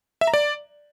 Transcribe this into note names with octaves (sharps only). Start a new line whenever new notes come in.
E5
A#5
D5